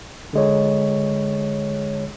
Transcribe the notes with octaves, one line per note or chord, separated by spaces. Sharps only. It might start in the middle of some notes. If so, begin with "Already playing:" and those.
D3 G#3 C#5